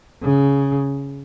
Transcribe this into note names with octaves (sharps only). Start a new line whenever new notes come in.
C#3